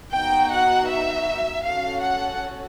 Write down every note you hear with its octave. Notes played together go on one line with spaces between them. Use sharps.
B3 D#4 F#4 G5
F#5
E5
C#4 F#4 A4 F5
F#5